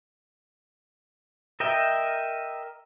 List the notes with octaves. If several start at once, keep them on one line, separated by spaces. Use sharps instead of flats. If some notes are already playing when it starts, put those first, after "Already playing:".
A#4 D#5 E5 G5